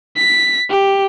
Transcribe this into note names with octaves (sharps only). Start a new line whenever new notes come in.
B6
G4